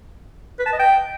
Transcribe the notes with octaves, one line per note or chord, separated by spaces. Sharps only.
B4
A5
D#5
G5